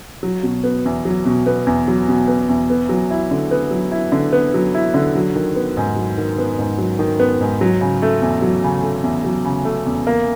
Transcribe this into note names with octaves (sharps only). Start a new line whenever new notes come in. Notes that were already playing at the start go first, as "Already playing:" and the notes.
F#3
B2
B3
E2
F#3
B2
B3
E2
F#3
B2
B3
E2
B3
F#3
E4
D3
B3
F#3
E4
D3
B3
F#3
E4
D3
F#3
D#3
B3
G#2
F#3
D#3
B3
G#2
F#3
D#3
B3
G#2
F#3
C#3
A3
E2
F#3
C#3
A3
E2
F#3
C#3
A3
E2
A#3